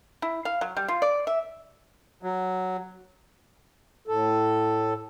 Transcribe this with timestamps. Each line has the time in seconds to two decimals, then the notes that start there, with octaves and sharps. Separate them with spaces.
0.22 E4
0.45 F5
0.61 F#3
0.77 G3
0.88 F4
1.02 D5
1.27 E5
2.23 F#3
4.08 A2 A4